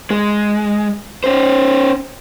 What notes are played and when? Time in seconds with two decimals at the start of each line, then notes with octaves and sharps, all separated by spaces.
0.11 G#3
1.24 C#4 C5